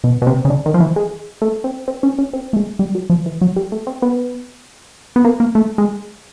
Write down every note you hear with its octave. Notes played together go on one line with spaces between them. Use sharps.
B2
B2
C3
C#3
D3
D#3
F3
E3
G#3
A3
C4
C4
C#4
C#4
C4
A3
G#3
G3
F#3
F3
E3
F#3
G3
A3
C4
B3
B3
A#3
A#3
A3
G#3